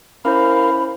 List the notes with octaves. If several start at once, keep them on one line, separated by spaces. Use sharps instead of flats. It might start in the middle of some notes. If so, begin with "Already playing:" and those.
C#4 E4 A#4 C5 F5 B5